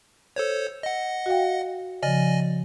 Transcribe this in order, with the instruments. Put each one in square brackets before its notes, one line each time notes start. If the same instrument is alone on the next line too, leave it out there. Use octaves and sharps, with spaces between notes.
[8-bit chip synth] A4 C5 C#5
D#5 F#5
[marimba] F#4 F5 G5
[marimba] C#3 F3 [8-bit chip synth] D5 D#5 G#5